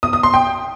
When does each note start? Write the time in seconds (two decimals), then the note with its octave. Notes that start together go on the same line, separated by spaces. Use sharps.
0.03 D#6
0.13 D#6
0.23 C6
0.34 G5